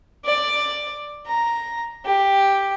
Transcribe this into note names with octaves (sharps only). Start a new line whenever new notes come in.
D5
A#5
G4